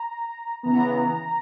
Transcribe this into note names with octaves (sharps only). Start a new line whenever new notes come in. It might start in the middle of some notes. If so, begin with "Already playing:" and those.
Already playing: A#5
C#3 E3 B3 A#5